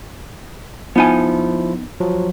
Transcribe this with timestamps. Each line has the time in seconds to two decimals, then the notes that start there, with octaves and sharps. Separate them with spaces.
0.96 F3 B3 D#4 E4 G#5
2.00 F3 F#3